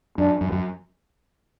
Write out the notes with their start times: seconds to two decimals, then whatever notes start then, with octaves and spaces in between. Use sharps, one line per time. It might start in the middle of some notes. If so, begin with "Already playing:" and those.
0.18 F#2 D4
0.41 F#2
0.52 F#2